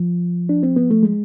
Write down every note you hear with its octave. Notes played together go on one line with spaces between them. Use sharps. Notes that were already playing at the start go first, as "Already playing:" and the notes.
Already playing: F3
D4
C4
B3
A3
G#3